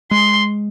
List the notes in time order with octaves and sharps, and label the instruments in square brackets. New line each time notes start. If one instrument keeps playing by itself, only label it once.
[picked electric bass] G#3 [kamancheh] C6